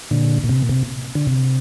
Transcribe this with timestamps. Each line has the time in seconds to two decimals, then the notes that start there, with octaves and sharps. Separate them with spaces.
0.11 A#2 D3
0.44 A#2
0.49 C3
0.62 A#2
0.69 C3
1.15 D3
1.27 C3